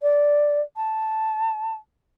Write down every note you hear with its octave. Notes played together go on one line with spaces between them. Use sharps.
D5
A5